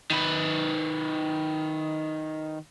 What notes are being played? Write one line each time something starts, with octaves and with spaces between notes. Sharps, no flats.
D#3 B4